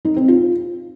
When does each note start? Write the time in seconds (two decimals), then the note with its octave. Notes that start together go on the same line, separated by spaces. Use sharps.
0.05 D#4
0.16 C4
0.28 F4